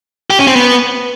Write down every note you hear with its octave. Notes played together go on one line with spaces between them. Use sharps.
G4
C#4
C4
B3